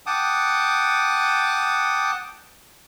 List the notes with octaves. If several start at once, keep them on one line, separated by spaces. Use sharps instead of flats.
F#5 G5 A5 D6 D#6